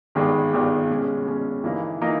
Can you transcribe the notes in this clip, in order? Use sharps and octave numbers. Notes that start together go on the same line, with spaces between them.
G#1 G2 D#3 G#3 B3
G#1 G2 D#3 G#3 B3
B2 G#3 C#4
B2 G#3 C#4
G1 G2 E3 A#3 D#4
E3 A#3 D#4